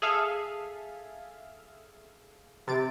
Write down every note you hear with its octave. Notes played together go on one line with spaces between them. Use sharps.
G#4 A4 E5 F5
C3 A6 D7